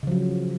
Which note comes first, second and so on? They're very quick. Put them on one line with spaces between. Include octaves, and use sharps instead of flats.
C#3 F3 F#3